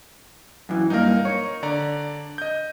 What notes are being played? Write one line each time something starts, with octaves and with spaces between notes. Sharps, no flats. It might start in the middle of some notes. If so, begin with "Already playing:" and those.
F#2 E3
G2 A#3 D#4 A#4
C#5
D3 D5 A#5
D#5 G6